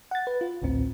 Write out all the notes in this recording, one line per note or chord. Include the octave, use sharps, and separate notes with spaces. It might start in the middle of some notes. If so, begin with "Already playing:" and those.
F#5 A6
B4
F4
A1 D2 A2 C4